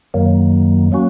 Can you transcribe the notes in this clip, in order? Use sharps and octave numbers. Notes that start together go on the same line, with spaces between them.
F#2 D#3 F#3 A#3
F#3 A#3 C#4 F#4